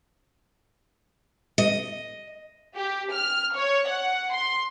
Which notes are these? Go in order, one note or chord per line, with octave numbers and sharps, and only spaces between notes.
D#5
G4
F6
C#5
F#5
C6